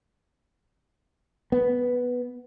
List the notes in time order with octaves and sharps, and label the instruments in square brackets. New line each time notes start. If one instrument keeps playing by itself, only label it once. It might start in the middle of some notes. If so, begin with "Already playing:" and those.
[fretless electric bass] B3